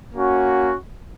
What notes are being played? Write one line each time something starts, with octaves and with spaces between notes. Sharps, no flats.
A#3 C#4 F#4